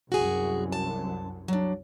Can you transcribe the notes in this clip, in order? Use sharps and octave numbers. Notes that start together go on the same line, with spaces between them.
C2 F#2 F#4 G#4
A5
F#3 D4